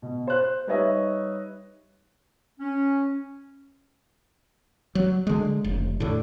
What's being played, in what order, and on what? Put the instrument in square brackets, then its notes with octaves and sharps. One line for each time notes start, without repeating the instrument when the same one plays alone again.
[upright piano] B2
C5 F#6
G3 D#4 B4 C#5 D#5 E5
[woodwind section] C#4
[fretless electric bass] F#3
D3 G#3
F1
A2 D3